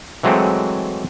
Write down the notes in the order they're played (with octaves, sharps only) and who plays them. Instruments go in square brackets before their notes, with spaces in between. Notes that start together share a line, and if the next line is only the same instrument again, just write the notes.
[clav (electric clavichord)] E3 F#3 G#3 A3 C4